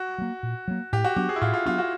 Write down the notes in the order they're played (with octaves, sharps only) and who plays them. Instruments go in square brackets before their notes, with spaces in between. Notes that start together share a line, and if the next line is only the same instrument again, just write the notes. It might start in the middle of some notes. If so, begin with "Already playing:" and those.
Already playing: [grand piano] F#4
[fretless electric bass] F#3 A#3
A#2
F#3 A#3
[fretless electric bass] A2 [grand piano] G4
[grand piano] F#4
[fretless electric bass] F#3 B3 D4 [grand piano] G4
[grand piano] G#4
E4
[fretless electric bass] A2 [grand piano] F4
[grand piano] F4
[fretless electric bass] F#3 B3 D4 [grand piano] F4
[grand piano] F#4